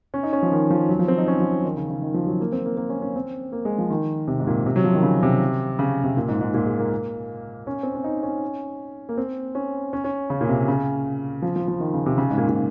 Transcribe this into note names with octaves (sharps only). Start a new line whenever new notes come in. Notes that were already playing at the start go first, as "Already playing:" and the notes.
C#4
D#4
C#4
F3
D#3
F3
F#3
F3
C4
D#4
C#4
F3
D#3
C#3
C#3
D#3
F3
F#3
A#3
C4
A#3
A#3
C#4
C#4
C4
A#3
G#3
F3
D#3
C3
G#2
A#2
C3
F#3
F3
D#3
C#3
C3
C#3
C3
A#2
G#2
G#2
A#2
G#3
A#3
C#4
C4
C#4
D#4
C#4
A#3
C4
C#4
C#4
C#4
C#3
A#2
C3
C#3
F3
F3
F3
D#3
C#3
C3
C#3
G#2
A#2
A#2